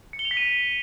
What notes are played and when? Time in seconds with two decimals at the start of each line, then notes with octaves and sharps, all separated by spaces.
0.13 C#7
0.19 G7
0.25 F7
0.31 B6
0.37 D#7